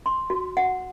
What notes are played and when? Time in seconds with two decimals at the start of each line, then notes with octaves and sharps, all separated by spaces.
0.06 C6
0.30 F#4
0.57 F#5